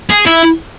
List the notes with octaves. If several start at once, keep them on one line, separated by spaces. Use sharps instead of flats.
G#4
E4